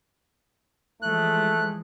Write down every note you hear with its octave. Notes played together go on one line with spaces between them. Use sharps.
E3 F3 G#3 A3 F#6